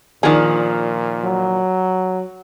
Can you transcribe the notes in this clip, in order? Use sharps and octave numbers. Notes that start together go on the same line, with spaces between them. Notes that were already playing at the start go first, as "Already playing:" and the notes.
A#2 D#3 F3 D4 G#4
F#3